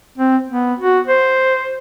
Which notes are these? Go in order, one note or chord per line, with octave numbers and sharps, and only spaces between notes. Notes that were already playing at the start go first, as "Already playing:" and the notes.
C4
B3
F#4
C5